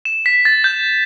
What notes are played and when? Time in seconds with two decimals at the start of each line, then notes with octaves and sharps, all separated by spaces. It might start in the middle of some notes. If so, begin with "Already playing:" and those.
0.05 E7
0.26 B6
0.45 A6
0.64 G6